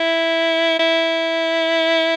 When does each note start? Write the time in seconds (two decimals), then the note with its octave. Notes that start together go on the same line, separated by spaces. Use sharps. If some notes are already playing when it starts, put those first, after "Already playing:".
Already playing: E4
0.79 E4